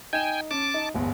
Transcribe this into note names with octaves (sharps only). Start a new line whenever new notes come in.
D#4 G5 G#5 E7
C#4 A5 D6
D#4
D1 G1 E2